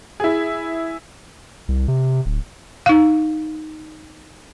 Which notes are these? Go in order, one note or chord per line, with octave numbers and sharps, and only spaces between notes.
E4 G#4
C2
C3
D1
D#4 F5